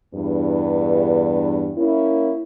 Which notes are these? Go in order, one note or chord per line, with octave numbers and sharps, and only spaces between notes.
E2 G2
A#3 C#4 E4